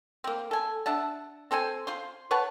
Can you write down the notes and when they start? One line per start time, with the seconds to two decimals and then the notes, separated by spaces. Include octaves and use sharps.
0.24 A#3 C4
0.51 A4 G#5
0.86 D4 E5 F#5 A5
1.51 C4 A4 C5 G#5
1.87 F4 C5 C6
2.31 B4 C#5 F#5 A5